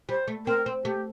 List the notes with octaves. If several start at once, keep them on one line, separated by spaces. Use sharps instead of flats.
G3 C5
A3
C4 A#4
C4
A3 G4